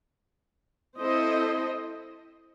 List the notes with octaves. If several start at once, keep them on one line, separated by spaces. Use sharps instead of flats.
C4 E4 A4 C5 D#5